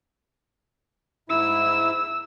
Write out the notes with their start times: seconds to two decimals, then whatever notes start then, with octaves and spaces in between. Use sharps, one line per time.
1.29 G#2 E4 E6